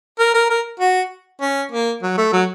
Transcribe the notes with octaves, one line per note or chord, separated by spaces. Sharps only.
A#4
A#4
A#4
F#4
C#4
A#3
F#3
A3
F#3